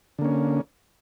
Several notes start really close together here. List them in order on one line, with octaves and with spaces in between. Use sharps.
D3 A#3 C#4